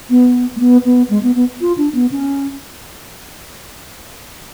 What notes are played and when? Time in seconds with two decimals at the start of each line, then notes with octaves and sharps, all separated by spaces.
0.10 B3
0.56 A3
0.60 B3
0.85 B3
1.10 G#3
1.23 B3
1.35 B3
1.61 F4
1.78 D4
1.95 B3
2.12 C#4